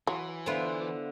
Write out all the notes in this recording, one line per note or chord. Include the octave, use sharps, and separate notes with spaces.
E3 F#3 C6
D3 B3 F4 C5 E5